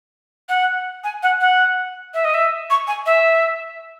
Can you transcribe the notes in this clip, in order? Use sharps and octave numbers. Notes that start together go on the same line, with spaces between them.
F#5
G#5
F#5
F#5
E5
D#5
E5
C#6
G#5
E5